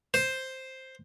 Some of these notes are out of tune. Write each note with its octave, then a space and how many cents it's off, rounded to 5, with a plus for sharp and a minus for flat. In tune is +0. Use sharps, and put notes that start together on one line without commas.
C5 +5